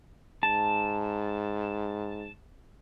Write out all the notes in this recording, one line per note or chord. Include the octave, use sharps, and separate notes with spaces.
G#2 A5